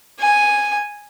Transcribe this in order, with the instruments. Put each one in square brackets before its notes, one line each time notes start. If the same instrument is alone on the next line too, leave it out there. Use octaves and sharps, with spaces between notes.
[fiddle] G#5